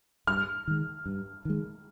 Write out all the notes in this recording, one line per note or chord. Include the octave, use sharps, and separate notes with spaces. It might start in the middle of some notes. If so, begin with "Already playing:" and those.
G2 F6
D#3 G#3
G2
D#3 G#3